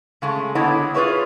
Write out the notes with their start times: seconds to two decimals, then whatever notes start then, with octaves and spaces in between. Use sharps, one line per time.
0.22 C#3 G#3 A3
0.55 D3 B3 E4 C#5 D#5
0.94 F4 G#4 B4 C#5 E5